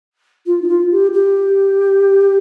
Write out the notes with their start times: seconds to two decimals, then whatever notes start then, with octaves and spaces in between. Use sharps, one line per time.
0.46 F4
0.61 D#4
0.68 F4
0.91 G4
1.13 G4